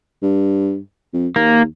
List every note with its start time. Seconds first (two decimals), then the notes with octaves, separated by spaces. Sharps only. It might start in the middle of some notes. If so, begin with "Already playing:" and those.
0.22 G2
1.13 F2
1.36 D#2 A#3